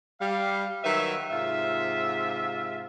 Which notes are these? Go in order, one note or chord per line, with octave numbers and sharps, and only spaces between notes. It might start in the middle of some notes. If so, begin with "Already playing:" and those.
G3 F5
D#3 F#3 B4 E5
G#2 C3 F4 E5